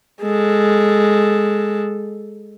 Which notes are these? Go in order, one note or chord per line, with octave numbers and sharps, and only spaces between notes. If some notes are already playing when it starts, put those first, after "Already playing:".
G#3 A4